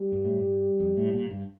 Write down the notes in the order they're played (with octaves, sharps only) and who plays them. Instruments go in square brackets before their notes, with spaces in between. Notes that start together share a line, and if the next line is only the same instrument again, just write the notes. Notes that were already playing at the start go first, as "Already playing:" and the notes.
Already playing: [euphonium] G3
[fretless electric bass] G2
A2
G2
F2
A2
A#2
G2